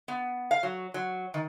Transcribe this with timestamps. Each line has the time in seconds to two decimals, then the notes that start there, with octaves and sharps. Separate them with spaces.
0.08 B3
0.51 F5
0.63 F#3
0.94 F#3
1.34 D#3